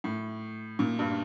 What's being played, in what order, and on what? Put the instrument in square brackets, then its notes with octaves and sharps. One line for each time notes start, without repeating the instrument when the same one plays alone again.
[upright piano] A2
A#2
G2